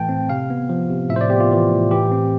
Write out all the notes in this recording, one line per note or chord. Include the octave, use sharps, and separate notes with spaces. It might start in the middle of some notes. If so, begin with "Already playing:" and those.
Already playing: A2 E3 A3 G5 A5
C4
C3 F5
B3
F3
C3
A2 E5
C5
D5
B3 G4
F4
E3
A2
E3 G4
C4